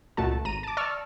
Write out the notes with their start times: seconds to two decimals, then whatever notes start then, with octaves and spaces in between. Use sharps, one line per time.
0.17 C#2 A#2 A3 F#4 A5
0.45 G#1 A#5 D#7
0.63 A5 D6
0.77 D5 A5 C#6 E6 F6